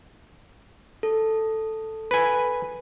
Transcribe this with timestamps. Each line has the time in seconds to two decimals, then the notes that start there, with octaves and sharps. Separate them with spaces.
1.03 A4
2.11 B4 G#5